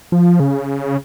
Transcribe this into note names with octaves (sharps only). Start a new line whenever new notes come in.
F3
C#3